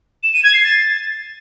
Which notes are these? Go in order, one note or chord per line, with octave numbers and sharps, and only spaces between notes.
E7
D#7
G#6
C7
A6